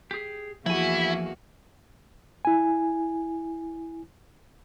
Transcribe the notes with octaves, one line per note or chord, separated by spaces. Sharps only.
G4 G#4
E2 F3 A#3 E4 F#4 G#5
E4 G#5